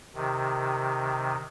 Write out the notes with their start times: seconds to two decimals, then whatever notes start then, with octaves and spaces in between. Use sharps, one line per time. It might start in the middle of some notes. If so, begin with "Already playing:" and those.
0.15 C3 D#3